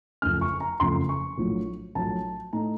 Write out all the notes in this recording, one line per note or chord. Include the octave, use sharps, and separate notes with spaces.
F#1 F2 C#3 A3 F6
C#6
A#5
F#1 F2 C#3 A3 C6
C#6
A#1 A2 F#3 A3
A#1 A2 F#3 A3 A5
A2 A3 D#4 A#5